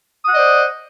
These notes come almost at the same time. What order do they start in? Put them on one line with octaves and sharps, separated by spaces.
D#6 F#5 D#5 D5 C5